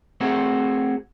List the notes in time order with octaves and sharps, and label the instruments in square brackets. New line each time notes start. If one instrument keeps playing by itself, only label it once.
[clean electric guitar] A3 C4 F#4 G#4 A#4